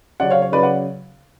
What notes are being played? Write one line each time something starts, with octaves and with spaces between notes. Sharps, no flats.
C#3 F#3 C#4 D5 F#5
C#5 F5
C#5
C#3 F#3 C#4 B4 D5
D5 F#5